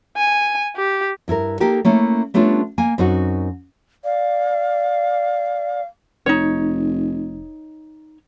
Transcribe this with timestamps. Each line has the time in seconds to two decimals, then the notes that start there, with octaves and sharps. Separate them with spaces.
0.17 G#5
0.77 G4
1.28 G2 E4 A4 A#4
1.60 A#3 D#4 G4 A4 A#4
1.85 A3 A#3 C#4 E4
2.34 G3 A3 B3 C#4 D4 F4
2.78 A#3 G#5
2.98 F#2 C4 D#4 F#4
4.04 D5 F5
6.26 F1 D#4 C#5